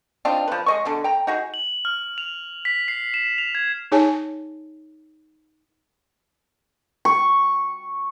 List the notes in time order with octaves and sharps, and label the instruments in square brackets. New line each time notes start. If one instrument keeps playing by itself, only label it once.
[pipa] C4 D4 D#4 F4
F3 B4
G#3 D#5 C#6
B2 D3
G5 A#5
D#4 F#4 G#4
[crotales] F#7
F6
F7
B6
C7
E7
F7
G#6
[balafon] D#4 G#4 C#5 G#5 A5
[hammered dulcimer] C#6